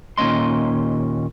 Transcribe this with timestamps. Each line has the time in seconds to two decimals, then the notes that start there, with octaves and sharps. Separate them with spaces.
0.18 D#2 A#2 C4 C#4 D#5 C6